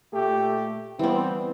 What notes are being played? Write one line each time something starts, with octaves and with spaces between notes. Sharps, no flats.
A#2 A3 G4
E3 G3 B3 C4